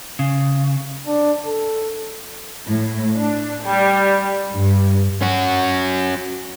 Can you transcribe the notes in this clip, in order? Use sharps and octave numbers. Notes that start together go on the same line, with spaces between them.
C#3
D4
A4
A2
D4
G3
G2
C#4 F#4